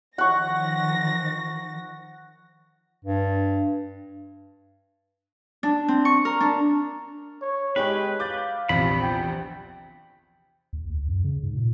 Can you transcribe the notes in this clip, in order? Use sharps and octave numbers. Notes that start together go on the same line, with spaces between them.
D#3 F3 F#5 C#6 A#6
G2
D4
C4
C#6
A#4
D4
C#5
G#3 G4 B4 C#5 G5
F5 D6 G6 A6
A#1 E2 C3 B5
G5
D#2
D2
F#2
C#3
G#2
A#2